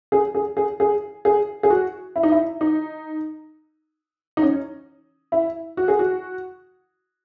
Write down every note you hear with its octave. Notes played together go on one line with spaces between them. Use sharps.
G#4
G#4
G#4
G#4
G#4
G#4
F#4
E4
D#4
E4
D#4
D#4
C#4
E4
F#4
G#4
F#4